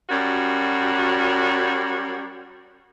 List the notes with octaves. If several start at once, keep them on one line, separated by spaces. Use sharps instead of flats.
F#2 G3 F#4